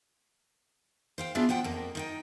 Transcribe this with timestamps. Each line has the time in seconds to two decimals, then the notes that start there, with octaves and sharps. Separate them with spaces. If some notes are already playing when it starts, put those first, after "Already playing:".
1.18 C5 F5 G5
1.35 B3 D4 F4 G#4 D5 E5
1.49 F3 C5 F#5 G5
1.64 F2 A#3
1.95 D#3 D#4 G5